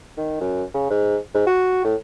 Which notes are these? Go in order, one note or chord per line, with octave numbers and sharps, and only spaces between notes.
D#3
F#2
C#3
G#2
G#2
F#4
A2